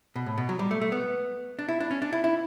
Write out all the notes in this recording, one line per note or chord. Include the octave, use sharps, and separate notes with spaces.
B2
A2
B2
F#3
G3
A3
A3
B3
D4
E4
D4
C#4
D4
E4
E4